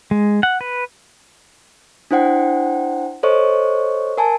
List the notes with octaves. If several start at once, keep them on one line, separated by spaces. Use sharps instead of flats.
G#3
F#5
B4
D4 E4 C5 F#5 G5
A4 C5 C#5 D#5 C#6
A#4 G#5 A5